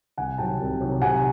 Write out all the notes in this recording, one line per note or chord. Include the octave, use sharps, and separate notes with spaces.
C2 F#5 G#5
C3 D#3 F#3 G5 A5
C2
C3 D#3 F#3
C3 F#5 G#5